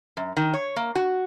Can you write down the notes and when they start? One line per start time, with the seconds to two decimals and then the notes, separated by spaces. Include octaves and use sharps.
0.17 F#2
0.37 D#3
0.54 C#5
0.76 A#3
0.95 F#4